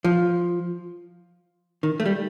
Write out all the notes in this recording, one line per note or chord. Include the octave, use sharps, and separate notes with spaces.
F3
D#3
A3
G3